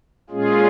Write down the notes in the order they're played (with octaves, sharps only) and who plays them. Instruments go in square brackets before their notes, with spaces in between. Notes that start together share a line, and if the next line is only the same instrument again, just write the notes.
[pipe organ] A#2 G#3 C#4 F4 G#4